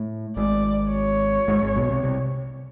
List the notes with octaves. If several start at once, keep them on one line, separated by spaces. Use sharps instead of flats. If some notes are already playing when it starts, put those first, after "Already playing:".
Already playing: A2
G#1 G#2 D5
C#5
G#1 G#2
G#1 G#2
B1 B2
C2 C3
C2 C3